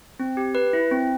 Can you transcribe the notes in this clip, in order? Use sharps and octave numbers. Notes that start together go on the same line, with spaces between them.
C4
G4
B4
E4
C4